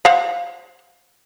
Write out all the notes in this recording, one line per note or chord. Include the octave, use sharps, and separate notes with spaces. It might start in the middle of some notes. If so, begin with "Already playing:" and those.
C5 F5 F#5